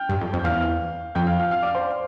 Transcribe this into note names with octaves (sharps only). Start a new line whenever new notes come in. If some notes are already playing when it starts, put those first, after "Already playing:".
Already playing: G5 F6 G6
G2
F2
F2
G6
E2 F5 F6
F2 G5 G6
F5 F6
F5 F6
F5 F6
D5 D6
C5 C6